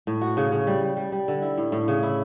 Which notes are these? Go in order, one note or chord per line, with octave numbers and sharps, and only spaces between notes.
A2
F#4
C#3
C#3
G3
G3
G3
G3
D3
E4
A2
A2
C#3
E4